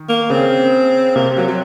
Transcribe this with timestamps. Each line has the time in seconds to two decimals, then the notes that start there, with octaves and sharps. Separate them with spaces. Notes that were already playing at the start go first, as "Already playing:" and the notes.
Already playing: D#3
0.08 A#3
0.30 C#3 C4
1.15 C3 A#3
1.37 F#3
1.48 F#3